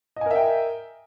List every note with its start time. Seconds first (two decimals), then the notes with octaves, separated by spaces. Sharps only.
0.16 D#5
0.21 G#5
0.26 A#4
0.31 E5
0.35 G5